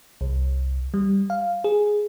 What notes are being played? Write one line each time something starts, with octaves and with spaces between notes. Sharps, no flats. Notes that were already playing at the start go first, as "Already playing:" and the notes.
C2
G3
F5
G#4